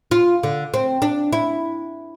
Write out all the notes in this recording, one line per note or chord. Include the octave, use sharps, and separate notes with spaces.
F4
D3
C4
D4
E4